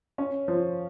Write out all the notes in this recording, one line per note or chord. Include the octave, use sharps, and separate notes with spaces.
C#4
F3